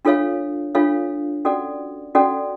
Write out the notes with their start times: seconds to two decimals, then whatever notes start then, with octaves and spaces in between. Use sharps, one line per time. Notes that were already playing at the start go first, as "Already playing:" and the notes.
0.05 D4 F4 A4 C#5 F5
0.75 D4 F4 A4 C#5 F5
1.45 C#4 F#4 A4 D5 F#5
2.15 C#4 F#4 A4 D5 F#5